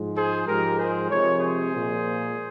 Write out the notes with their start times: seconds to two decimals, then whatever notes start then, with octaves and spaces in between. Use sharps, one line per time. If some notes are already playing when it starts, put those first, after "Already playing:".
Already playing: G#2 F3 G#3
0.16 G#4 C5
0.47 G#2 F3 G#3 G4 A#4
0.78 G#4 C5
1.08 C3 F3 G#3 A#4 C#5
1.39 G#4 C5
1.70 A#2 F3 G#3